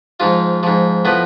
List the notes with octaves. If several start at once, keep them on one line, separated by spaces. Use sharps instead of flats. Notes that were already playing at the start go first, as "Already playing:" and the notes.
G#2 F3 F4
G#2 F3
A2 F3 B3